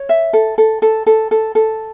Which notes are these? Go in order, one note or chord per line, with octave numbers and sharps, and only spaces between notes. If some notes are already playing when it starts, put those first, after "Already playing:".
Already playing: C#5
E5
A4
A4
A4
A4
A4
A4